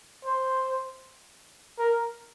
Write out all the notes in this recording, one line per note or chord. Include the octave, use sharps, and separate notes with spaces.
C5
A#4